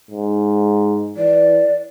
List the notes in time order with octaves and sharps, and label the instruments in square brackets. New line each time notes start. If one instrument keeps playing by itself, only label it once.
[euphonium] G#2
[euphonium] E3 [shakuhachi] D5